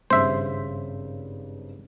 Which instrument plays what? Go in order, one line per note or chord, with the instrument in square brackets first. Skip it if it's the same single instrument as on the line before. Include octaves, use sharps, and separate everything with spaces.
[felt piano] G#1 G2 C#3 [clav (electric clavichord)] C5 E5